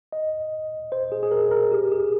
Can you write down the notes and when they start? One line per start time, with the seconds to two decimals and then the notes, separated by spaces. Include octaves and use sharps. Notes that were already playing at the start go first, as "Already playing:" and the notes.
0.12 D#5
0.92 C5
1.12 G#4
1.23 G#4
1.31 A#4
1.51 A#4
1.72 G4
1.92 G#4